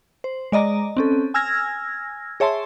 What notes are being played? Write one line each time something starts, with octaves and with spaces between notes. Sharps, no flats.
C5
G#3 D5 D#5 A#5
C4 C#4 A4
G#5 E6 F6 G#6 A#6
G#4 C#5 E5 A5 C6